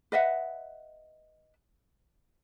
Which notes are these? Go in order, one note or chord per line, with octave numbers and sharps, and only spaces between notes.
B4 D#5 E5 F#5